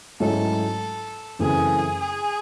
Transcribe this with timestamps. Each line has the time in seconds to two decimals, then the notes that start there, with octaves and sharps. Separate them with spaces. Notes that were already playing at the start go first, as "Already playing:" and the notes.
0.20 G#2 F#3 A3 C#4 E4 A4
1.39 F#2 C#3 E3 A3 C4 G#4
2.00 G#4